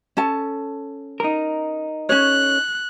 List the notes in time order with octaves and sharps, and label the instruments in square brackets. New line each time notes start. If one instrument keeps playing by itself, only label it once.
[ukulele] C#4 A4 A5
[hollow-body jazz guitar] D#4 A#4
[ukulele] C#4 A4 C#5 [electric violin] F#6